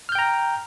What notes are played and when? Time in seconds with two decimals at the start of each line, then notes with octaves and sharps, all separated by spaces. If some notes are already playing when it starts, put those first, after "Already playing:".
0.09 F6
0.12 G6
0.15 G5
0.19 A#5